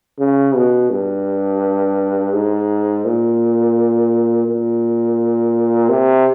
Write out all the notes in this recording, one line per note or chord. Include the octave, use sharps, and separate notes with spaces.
C#3
B2
G2
G#2
A#2
A#2
C3